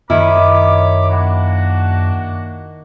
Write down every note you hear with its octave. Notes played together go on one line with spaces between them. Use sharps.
F#2 D#3 E4 C#5 B5 D6
A#3 D4 F#4